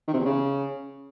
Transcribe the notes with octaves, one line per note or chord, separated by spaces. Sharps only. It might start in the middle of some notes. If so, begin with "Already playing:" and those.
D#3
C3
E2
C#3